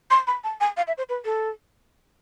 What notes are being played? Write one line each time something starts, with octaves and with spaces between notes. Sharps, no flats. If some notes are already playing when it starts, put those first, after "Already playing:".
C6
B5
A5
G#5
F5
E5
C5
B4
A4